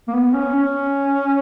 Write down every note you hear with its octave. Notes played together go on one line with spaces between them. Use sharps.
A#3
B3
C#4
C#4